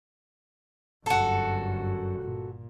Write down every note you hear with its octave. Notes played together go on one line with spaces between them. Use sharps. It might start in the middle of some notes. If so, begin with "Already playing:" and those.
G1 F#2 F#4 A4
A#2